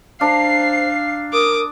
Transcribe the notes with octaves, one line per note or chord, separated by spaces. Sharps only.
D4 C5 F5 A#5 C7
A#4 D6 D#6